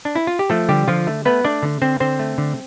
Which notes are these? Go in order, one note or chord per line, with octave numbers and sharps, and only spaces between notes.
D4
E4
F4
G4
F3 A3 A4
D3 G3 G4
D3 F3 F4
A3
A3 B3 B4
A3 D4 D5
D3
D3 C4 C5
D3 C4 C5
A3
D3